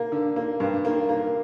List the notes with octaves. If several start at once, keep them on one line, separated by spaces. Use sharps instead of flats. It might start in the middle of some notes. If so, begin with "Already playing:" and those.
Already playing: A#3
D3
A#3
G2
A#3
A#3